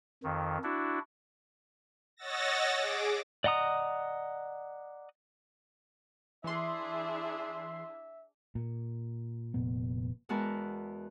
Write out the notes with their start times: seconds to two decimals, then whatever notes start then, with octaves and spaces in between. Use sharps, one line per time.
0.24 F2 D#3
0.63 D4 E4 F#4
2.17 C#5 D#5 F#5 E6 A6 A#6
2.78 G#4 D6
3.44 D5 D#5 F#5 A#5 D#6
6.44 E3 D4 E4 G#4 E5 C6
8.55 A#2
9.54 F1 A#2 B3
10.29 E2 G#3 F#4 A#4 B4 A5